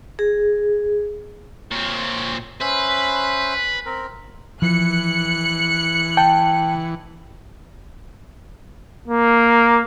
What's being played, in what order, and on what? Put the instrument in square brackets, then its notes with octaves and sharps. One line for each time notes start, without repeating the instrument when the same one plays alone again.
[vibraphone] G#4
[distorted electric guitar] A#2 C4 [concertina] C#5
[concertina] C#4 C5 E5 [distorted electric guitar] B4
[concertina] C4 A#4
[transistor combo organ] E3 [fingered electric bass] F3 [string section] F#6 C#7
[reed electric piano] G5 A5
[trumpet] A#3